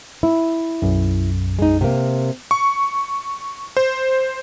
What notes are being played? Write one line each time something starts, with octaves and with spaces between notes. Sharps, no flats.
E4
B1 F#2
G#3 D#4
C3 A#3
C#6
C5